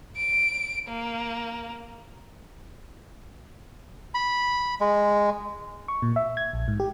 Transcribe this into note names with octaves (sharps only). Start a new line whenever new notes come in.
D7
A#3
B5
G#3
C#6
A#2
E5
G#6
A#1
G#2
G4